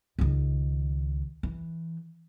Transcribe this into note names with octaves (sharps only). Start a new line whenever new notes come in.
C#2 D#3
E3